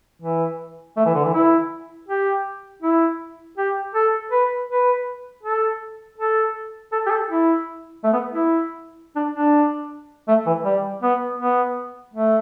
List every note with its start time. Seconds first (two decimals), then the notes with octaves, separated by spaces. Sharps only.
0.22 E3
0.97 A3
1.06 E3
1.15 D3
1.25 E3
1.34 E4
2.08 G4
2.82 E4
3.57 G4
3.95 A4
4.31 B4
4.69 B4
5.43 A4
6.18 A4
6.92 A4
7.07 G4
7.10 A4
7.29 E4
8.04 A3
8.13 B3
8.32 E4
9.16 D4
9.35 D4
10.28 A3
10.46 E3
10.65 G3
11.02 B3
11.39 B3
12.14 A3